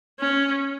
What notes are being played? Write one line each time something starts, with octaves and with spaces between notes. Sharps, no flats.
C#4